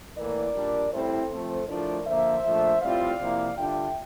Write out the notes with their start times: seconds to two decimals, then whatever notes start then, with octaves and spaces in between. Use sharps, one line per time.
0.17 A2 E3 A#3 A#4 D5
0.55 A#2 G3 D4
0.92 A2 G3 C4 E4 A4 C5
1.31 F3 A3 C4
1.68 A2 F3 A3 D4 F4 A#4 D5
2.06 D3 F3 A#3 C5 E5
2.45 A#2 F3 A3 D4
2.82 A2 G3 C4 F4 D5 F5
3.19 C3 F3 A#3 E4
3.57 D3 G3 D4 F4 E5 G5